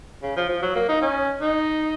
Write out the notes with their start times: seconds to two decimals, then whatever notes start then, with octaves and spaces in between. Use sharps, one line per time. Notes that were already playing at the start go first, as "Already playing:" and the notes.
0.23 C#3
0.36 F3
0.49 F3
0.62 F#3
0.75 A#3
0.89 D#4
1.02 C#4
1.41 D#4